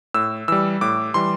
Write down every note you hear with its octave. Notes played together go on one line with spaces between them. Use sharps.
A2 E6
E3 G3 E6
A2 D6
E3 G3 C6